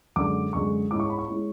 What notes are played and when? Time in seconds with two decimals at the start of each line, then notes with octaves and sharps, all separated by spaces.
0.16 F#2 D3 G#3 D6
0.53 F#2 D3 G#3 C#6
0.91 G#2 G#3 C#4 E4 D6
1.00 C#6
1.10 B5
1.19 C#6
1.28 G#3 C#4 E4